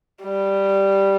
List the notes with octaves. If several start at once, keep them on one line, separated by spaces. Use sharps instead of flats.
G3